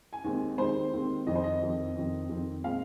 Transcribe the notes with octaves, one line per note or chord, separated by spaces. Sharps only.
G#5
D#2 D#3 G#3 C4
D#2 D#3 G#3 C4 C5
D#2 D#3 G#3 C4
F2 D#3 C4 D#5
C5
D#5
F2 D#3 C4
F2 D#3 C4
F2 D#3 C4
A#2 G#3 C4 F5